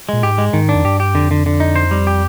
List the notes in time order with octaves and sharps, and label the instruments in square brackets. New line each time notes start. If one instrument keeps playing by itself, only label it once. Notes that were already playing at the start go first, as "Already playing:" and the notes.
[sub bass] A#2 [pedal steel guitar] G#3
[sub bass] G#2 [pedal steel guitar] G4
[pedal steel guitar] G#3
[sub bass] G#2 [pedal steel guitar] D#3
[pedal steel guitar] D4
[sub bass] F2
[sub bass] G2 [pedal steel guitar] G4
[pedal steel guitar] G4
[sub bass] F2 [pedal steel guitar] D3
[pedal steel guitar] D3
D3
D#4
C5
G3
G4